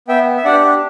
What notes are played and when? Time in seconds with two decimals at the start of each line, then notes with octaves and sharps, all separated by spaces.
0.08 B3 E5 G5
0.37 E5
0.45 D4 G4 D5 F#5